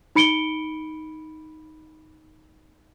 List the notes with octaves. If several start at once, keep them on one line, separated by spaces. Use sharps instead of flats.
D#4 B5 C#7 D7 G7